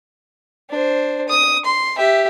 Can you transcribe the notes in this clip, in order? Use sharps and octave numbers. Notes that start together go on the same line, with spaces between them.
D4 C5
D#6
C6
G4 E5